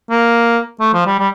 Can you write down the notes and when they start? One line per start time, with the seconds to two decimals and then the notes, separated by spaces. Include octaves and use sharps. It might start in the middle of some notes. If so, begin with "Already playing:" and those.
0.11 A#3
0.80 A3
0.94 F3
1.06 G3
1.19 G3